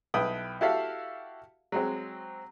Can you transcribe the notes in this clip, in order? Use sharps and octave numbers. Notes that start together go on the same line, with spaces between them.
B1 E4 B4 G5 D#6
E4 F#4 G4 A4 E5 F5
F#3 G#3 C4